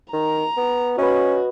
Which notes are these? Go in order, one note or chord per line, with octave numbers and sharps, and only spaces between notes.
D#3 A#5
B3
C#4 F#4 B4 D#5